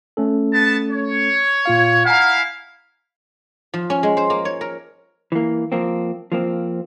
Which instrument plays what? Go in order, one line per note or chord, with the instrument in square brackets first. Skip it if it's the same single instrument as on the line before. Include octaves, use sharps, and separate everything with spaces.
[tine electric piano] A3 C#4 A4
[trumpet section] B3 A5
C#5
[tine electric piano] A#2 F4 F5
[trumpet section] E4 F5 [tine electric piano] F#5 G#5 A#5
[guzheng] F3
C#4
G#3
C5
A#3
C#5
A#4
[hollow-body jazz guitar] E3 A#3
F3 A#3 C4
F3 A#3 C4